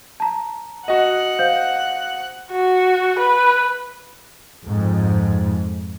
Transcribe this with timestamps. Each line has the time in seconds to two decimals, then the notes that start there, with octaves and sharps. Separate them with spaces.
0.20 A5 A#5
0.88 F#4 D#5 F#5
1.39 C5 F5 G6
2.51 F#4
3.19 B4
4.65 F2 G#2